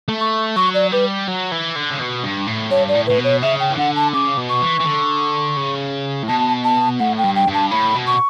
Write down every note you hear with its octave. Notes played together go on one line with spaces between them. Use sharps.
A3
C#6
F#3 C#6
D5
G3 B4
F#3
E3
D3
C#3
B2
G2
A2
G2 C#5
D5
A2
A2 B4
B2
C#5
C#3 E5
G5
E3
D3 F#5
A5
C#3 D6
B2
C#6
E3
E3
D3
C#3
A2
B2 A5
A5
A2 F#5
G5
G2
G5
G2
A5
A2 B5
B2
C#6